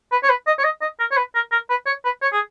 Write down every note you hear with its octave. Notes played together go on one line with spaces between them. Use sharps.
B4
C#5
B4
D#5
C#5
D#5
D#5
A#4
C#5
B4
A#4
A#4
B4
C#5
B4
C#5
G#4